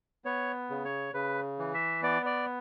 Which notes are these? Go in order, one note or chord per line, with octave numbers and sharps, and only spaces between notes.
B3 C#5
C#3
C#5
C#3 B4
E3
E5
B3 D5
D5